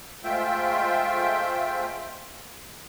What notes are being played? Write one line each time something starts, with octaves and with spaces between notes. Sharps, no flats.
G#3 A3 F4 C5 E5 G5